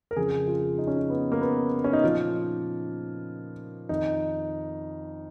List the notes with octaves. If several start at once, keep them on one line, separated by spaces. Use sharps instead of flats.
A#4
F2 C#3 F3 G#4
F4
D#4
C#4
D#4
B3
A#3
B3
C#4
D#4
A#2 F3 F4
F2 D#3 D#4